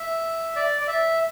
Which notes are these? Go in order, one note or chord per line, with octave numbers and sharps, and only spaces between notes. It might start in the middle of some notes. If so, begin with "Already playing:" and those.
Already playing: E5
D5
D5
E5